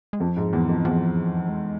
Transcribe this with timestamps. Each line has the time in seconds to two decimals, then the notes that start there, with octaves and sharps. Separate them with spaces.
0.13 G#3
0.20 F2 F3
0.37 G#2
0.53 E2
0.69 F2
0.85 E2 F3
1.49 G#3